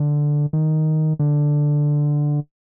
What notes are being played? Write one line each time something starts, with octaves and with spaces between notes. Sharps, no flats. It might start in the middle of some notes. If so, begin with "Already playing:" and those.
Already playing: D3
D#3
D3